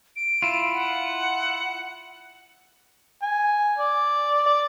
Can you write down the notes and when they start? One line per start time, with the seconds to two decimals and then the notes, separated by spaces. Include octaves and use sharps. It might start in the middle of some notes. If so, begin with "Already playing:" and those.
0.16 D7
0.42 E4 F4
0.74 F#5
3.22 G#5
3.78 D5
4.46 D5